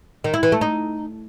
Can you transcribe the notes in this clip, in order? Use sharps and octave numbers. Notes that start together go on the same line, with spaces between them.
D#3
E4
E3
A3
D#4